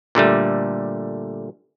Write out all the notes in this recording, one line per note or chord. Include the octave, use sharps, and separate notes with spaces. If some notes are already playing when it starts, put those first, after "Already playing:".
A#2 D3 G3 A3